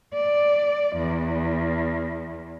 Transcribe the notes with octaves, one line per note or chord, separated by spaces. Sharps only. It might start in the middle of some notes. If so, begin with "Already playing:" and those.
D5
E2